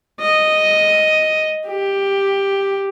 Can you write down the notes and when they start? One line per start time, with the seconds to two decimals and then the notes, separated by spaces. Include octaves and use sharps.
0.21 D#5
1.67 G4